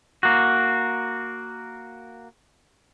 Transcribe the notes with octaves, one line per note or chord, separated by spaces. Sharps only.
A#3 F#4